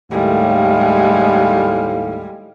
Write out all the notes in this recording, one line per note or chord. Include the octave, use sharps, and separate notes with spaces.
D#2 A2 G3 G#3 F5